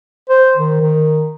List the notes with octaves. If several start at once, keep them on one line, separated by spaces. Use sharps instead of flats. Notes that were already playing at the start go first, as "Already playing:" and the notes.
C5
D#3
D#3